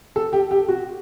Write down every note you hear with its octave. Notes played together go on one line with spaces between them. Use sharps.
A4
G4
G4
F#4